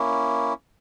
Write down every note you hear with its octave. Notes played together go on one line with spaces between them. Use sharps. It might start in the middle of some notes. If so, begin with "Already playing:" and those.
Already playing: A#3 C#4 E4